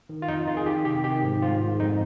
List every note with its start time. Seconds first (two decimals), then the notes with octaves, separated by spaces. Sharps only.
0.09 D#3
0.22 F4
0.28 F2 D#4
0.47 D#3 F4
0.57 G#4
0.66 D#3 G4
0.85 C3 G4
1.04 D#3 G4
1.23 G#2
1.42 G#2 F4
1.61 G#2
1.80 F2 D#4